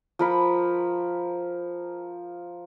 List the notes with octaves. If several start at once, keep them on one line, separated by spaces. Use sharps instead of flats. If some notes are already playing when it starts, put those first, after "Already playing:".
F3 A#4 B5